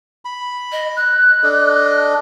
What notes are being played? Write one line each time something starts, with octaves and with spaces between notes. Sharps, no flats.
B5
D#5
F#6
D4 A4 D#5